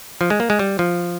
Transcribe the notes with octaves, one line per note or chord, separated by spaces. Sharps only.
F3
G#3
A#3
G#3
G3
F3